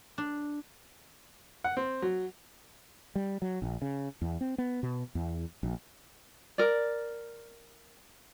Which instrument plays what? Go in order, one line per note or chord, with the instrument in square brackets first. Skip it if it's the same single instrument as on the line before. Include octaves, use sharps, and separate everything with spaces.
[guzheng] D4
[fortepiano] F#5
C4
F#3
[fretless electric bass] G3
F#3
A#1
C#3
E2
C4
B3
B2
E2
A#1
[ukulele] A#4 D5